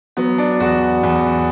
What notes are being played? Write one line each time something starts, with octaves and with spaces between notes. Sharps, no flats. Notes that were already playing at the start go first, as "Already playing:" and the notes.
F#3 B3
D4
E2 F#4
E2